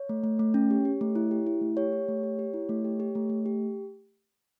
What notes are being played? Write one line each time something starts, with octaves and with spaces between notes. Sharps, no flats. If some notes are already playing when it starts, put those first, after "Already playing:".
Already playing: C#5
A3
A3
A3
C#4
G4
G4
A3
E4
G4
E4
A3
G4 C#5
G4
A3
G4
G4
E4
A3
G4
G4
A3
A3
G4